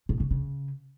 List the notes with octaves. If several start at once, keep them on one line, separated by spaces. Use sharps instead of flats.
A2
C#3
C#3